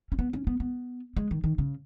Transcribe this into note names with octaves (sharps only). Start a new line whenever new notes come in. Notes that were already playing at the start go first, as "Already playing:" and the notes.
C#4
B3
C#4
B3
B3
G#3
D#3
D#3
C#3